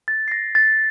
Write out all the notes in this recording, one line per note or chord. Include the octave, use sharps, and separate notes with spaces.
A6
C7
A#6
A6